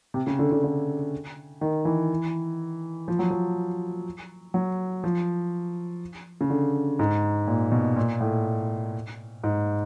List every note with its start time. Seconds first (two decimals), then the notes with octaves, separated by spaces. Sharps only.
0.14 C3
0.27 C#3
0.39 D3
0.52 D3
0.64 D3
1.61 D#3
1.85 E3
3.08 F3
3.19 F#3
3.30 F3
4.54 F#3
5.04 F3
6.41 C#3
6.50 D3
6.99 G#2
7.47 A#2
7.72 B2
7.96 A#2
8.21 A2
9.44 G#2